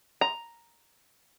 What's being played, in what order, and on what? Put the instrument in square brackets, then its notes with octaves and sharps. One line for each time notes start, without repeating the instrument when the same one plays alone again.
[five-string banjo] A#5